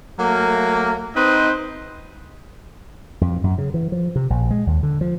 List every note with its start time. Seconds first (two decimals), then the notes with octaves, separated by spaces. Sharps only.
0.19 F#3 A3 A#3
1.16 C4 D#4 B4 C5 D#5
3.21 F2
3.44 F#2
3.58 C#3
3.74 E3
3.92 F3
4.16 C3
4.30 A#1
4.51 G#3
4.67 D#2
4.83 D3
5.01 F3